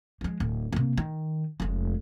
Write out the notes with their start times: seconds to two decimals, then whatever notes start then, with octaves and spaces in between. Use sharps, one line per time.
0.21 F3 G#3
0.40 D1
0.73 C3 A#3
0.98 D#3
1.60 F1 G#3